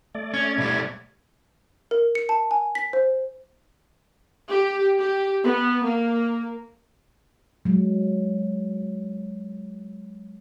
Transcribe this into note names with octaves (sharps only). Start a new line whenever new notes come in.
A3 D5
C#4 G#6
B2 G3
A#4
C#7
A5
G#5
B6
C5
G4
G4
B3
A#3
F#3 G#3